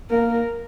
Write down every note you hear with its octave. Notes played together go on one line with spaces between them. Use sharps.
A#3 A#4